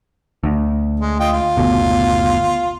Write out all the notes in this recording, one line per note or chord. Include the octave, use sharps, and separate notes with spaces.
D2
G#3
F4 D#5 G5
F4
F#1 D2 B2